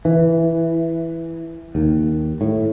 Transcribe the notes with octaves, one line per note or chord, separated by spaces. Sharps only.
E3
D#2
A2